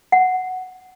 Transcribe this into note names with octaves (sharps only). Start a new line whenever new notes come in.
F#5